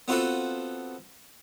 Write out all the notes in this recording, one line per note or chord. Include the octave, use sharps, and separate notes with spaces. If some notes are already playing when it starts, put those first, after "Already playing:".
B3 C4 F4 F#4 A4 B4